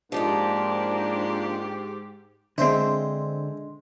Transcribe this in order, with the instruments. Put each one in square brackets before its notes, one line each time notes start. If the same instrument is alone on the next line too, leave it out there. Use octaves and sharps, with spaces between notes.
[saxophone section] G#2 G4 [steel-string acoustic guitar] F3 D#4 F4 [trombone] A#3 [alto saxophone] D4
[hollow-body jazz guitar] D3 C4 [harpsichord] G#3 C5 E5